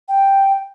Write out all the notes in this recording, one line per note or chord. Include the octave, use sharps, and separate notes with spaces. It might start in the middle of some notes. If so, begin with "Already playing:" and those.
G5